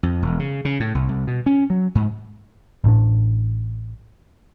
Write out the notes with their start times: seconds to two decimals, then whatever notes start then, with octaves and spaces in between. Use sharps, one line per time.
0.03 F2
0.22 E1
0.39 C#3
0.65 C#3
0.80 A2
0.95 C2
1.09 C2
1.27 B2
1.46 C#4
1.70 F#3
1.95 G#2
2.84 A1 A2 D4